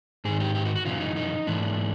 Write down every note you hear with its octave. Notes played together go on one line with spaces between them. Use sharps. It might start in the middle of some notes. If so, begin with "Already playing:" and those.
G#2 D#3 G#4
G4
G4
F#4
F#4
F#2 C#3 E3 F4
D#4
D#4
G#2 E3 D4